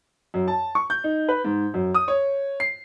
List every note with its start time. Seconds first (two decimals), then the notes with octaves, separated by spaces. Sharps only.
0.34 F#2
0.48 A5
0.75 C#6
0.90 G6
1.04 D#4
1.29 B4
1.44 G#2
1.74 F#2
1.94 D#6
2.08 C#5
2.60 C7